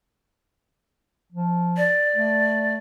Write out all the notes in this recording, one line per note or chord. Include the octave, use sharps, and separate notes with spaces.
F3
D5
A3